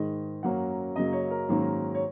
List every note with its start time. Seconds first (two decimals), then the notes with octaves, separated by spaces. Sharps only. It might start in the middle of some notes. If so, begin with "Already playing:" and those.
Already playing: G#2 D#3 G#3 D#5
0.43 F#2 F#3 A#3 C#4 F#5
0.95 F#2 C#3 F#3 A#3 D#5
1.13 C#5
1.31 A#4
1.48 G#2 D#3 F#3 A#3 C#4
1.95 C#5